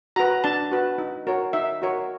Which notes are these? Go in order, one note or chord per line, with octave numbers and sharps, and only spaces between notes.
F#4 B4 A#5
D4 A5
F#4 B4
D#4
F#4 A#4 C#5
D#4 E5
F#4 A#4 C#5